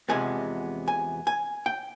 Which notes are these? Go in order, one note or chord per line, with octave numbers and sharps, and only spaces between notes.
E2 C3 F3 G#3 B3 G#5
G#5
G#5
G5